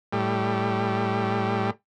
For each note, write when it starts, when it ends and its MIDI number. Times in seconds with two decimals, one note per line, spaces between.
0.13 1.70 45
0.13 1.70 55